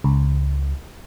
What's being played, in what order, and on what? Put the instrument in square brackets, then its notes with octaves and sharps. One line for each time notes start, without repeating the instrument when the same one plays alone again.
[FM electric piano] C#2